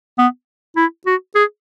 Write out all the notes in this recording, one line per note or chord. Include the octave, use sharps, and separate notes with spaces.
B3
E4
F#4
G#4